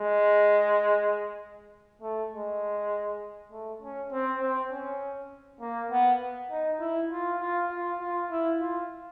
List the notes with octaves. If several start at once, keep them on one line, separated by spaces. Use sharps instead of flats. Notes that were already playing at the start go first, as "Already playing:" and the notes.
Already playing: G#3
A3
G#3
A3
C#4
C4
C4
C#4
A#3
B3
D#4
E4
F4
F4
F4
F4
E4
F4